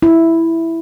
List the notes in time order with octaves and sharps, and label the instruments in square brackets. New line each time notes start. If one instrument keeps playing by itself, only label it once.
[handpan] E4